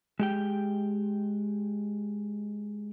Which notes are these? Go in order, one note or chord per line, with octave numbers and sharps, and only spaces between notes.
G#3 G4 G5